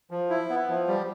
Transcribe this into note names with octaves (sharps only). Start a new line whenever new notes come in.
F3
E4
B3
F3
G3